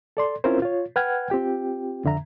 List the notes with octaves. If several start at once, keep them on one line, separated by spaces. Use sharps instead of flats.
A4 D5 C6
C4 C#4 E4 F4 A#4 C5
F4 C#5
B4 F#5 G5 F6 G#6
C4 F4 G4 G5
F2 D3 E5 A#5